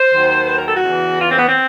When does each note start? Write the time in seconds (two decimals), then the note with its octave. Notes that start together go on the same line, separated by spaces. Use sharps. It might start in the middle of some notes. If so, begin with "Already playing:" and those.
Already playing: C5
0.11 D#2 D#3 F#3
0.47 B4
0.56 A#4
0.65 A4
0.73 F#4
0.82 E2 C#3 E3
1.19 F4
1.27 C4
1.36 B3
1.46 C4